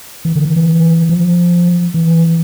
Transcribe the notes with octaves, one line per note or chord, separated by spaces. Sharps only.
E3
D3
E3
E3
F3
E3